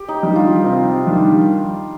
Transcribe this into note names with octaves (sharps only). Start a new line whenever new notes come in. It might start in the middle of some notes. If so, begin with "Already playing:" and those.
Already playing: G4
D#4
D#3 G3 D4
F4
C3
D#3 G3 D4